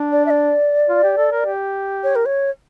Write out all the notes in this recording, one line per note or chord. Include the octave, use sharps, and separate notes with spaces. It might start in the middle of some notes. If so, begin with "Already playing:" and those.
Already playing: D4
D5
E5
D5
F4
G4
A4
A#4
G4
C#5
A#4
C#5